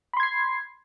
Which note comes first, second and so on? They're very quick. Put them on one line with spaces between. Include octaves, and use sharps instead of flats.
B5 C6 G#6 C7